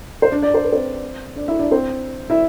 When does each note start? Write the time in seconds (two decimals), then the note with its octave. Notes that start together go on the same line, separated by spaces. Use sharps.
0.22 C5
0.31 D4 D5
0.42 D4 D5
0.54 C5
0.64 B4
0.72 C4 C5
1.36 D4 D5
1.48 E4 E5
1.59 D4 D5
1.71 C4 C5
2.30 E4 E5